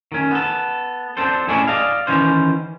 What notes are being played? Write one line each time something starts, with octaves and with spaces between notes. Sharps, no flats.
D#3 C#4
B3 A4
C4 D4 A4 C5
A2 G#3 C#4 D4 E4
D5 D#5 F5
D#3 E3 C#4 C5